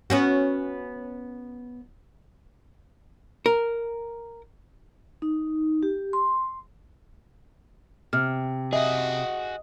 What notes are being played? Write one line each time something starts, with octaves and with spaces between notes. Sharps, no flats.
B3 C#4 F#4
A#4
D#4
G4
C6
C3 F6
F#4 G#4 D#5 E5